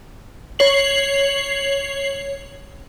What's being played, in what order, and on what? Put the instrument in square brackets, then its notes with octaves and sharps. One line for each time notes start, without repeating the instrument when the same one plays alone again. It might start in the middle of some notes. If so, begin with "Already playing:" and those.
[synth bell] C#5 C7 F#7